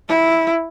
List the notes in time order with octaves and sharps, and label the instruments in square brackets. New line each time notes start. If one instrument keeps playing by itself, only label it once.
[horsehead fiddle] E4